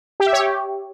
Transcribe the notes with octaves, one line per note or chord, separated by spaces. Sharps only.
G4
E5
C#5
G4